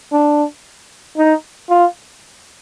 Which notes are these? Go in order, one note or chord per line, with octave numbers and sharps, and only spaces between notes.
D4
D#4
F4